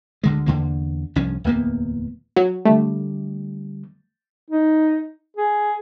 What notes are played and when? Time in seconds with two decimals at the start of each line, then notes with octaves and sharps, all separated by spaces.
0.24 D2 D3 G#3
0.46 E2 D3 A#3
1.16 C2 G2 F3 C#4
1.44 D1 E2 A#3 B3
2.36 F#3 F#4
2.65 D3 G3 A3
4.51 D#4
5.37 G#4